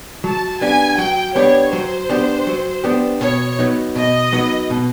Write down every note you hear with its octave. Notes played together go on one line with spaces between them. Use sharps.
F#3 A5
B3 D4 G4 G#5
F#3 G5
B3 D4 G4 C#5
F#3 C5
B3 D4 G4
F#3
B3 D4 G4
B2 C#5
F#3 B3 D#4
B2 D#5
F#3 B3 D#4
B2